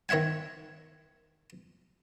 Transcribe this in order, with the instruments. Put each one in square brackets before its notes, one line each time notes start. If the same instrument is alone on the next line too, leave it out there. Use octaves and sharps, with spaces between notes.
[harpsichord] D#3 C#5 E5 F#5 G#5